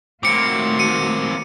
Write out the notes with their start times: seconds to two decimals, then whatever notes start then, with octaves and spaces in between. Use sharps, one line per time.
0.23 D#3 A3 A#3 C4 F#4 D6 C#7
0.79 C#7 D#7